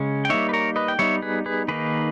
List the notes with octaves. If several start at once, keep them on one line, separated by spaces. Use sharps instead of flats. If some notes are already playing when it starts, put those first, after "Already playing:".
Already playing: C#3 G#3 C#4
G5
G3 A#3 D#4 C#5 E5
B4
A#4 C#5
B4 D#5
G5
G3 B3 D#4 C#5 E5
G#4 B4
G#4 B4
D#3 A#3 D#4 G#4 B4